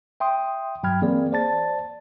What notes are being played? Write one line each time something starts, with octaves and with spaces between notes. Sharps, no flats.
E5 G5 C6 D#6
G2 F#3 G5 B5 F6 G#6
E3 A#3 C4 G#4 D5
C5 D5 A5 A6